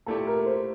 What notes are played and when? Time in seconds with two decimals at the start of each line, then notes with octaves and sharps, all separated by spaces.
0.06 A#2 A3 E4 G4 A4
0.27 A#4
0.46 C5